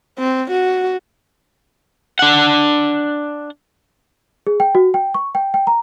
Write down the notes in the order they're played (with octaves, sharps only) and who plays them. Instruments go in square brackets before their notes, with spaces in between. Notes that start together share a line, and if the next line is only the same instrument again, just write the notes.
[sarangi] C4
F#4
[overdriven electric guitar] D4 F#5
[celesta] G#4
G5
F#4
G5
C#6
G5
G5
A#5